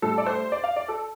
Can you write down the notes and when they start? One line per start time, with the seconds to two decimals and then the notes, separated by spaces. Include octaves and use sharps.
0.02 A2 G3 D4 A4
0.18 D5
0.26 C5
0.52 D5
0.64 F5
0.76 D5
0.88 A4